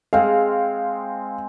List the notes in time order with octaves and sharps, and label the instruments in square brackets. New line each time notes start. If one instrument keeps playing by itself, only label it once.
[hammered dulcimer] G#3 C4 [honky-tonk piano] F5